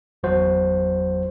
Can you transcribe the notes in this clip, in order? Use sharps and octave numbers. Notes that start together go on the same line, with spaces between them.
G1 E2 F#3 F#4 C5